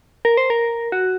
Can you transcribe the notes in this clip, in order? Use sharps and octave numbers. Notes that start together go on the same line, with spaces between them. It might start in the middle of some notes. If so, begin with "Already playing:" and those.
A#4
C5
A#4
F#4